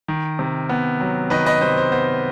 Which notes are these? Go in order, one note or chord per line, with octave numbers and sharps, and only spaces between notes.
D#3
C3
B3
F#3
D#3 B4 D#5
B4 D#5
C3 C5
C5
B3 C5